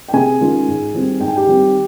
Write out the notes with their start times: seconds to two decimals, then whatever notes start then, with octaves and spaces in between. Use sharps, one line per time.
0.09 G5
0.13 C3 G#4 G#5
0.41 D#3 G#3 C#4 F4
0.67 G#2
0.94 D#3 G3 C4
1.19 G#2 G5
1.28 G#5
1.36 G4 G5
1.47 D#3 G3 C4